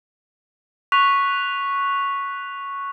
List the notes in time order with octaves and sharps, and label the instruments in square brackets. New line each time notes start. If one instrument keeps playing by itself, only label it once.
[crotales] C#6 F#6 B6 F7